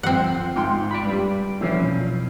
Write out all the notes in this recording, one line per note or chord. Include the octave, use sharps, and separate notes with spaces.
D2 F3 C4 F#5
G#2 F4 G5 C6
D5 B5
G2 G3
B1 A#2 E3 F3 C4 C#4